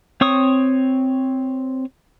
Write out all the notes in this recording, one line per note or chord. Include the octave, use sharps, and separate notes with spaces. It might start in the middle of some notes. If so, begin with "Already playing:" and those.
C4 C#5 C#6 D#6